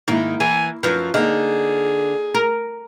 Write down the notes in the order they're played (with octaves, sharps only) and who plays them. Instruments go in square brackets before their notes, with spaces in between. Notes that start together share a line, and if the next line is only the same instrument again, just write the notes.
[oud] G#2 D#3 [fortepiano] A#3 E4
[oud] E3 [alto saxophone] G#5
[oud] F#2 F3 [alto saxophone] F4 [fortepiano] B4
[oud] D3 [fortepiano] A#3 D#4 F6 [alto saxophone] G#4
[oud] A#4